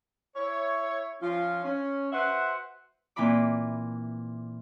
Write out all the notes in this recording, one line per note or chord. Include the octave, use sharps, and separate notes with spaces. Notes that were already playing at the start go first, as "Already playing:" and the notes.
E4 C#5
F3 C#4 F4
C#4
F#4 B4 C5 E5 F#5
A#2 E3 C4 B5 D6